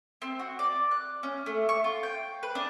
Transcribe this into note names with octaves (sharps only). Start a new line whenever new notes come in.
C4
F#4
D5
F#6
C#4
A3
C#6
F4
G5
B4
D4